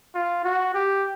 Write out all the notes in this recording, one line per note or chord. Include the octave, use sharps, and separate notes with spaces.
F4
F#4
G4